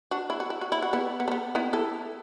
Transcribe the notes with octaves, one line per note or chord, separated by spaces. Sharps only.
D4 F#4
E4
F#4
E4
F#4
E4
F#4
B3 E4
B3
A3
B3
B3 E4
E4 A4